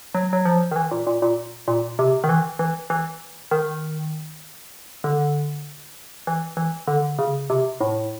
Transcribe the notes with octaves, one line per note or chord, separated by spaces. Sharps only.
F#3
F#3
F3
D#3
E3
A#2
A#2
A#2
A#2
C3
D#3
E3
E3
E3
D#3
D3
E3
E3
D3
C#3
C3
A2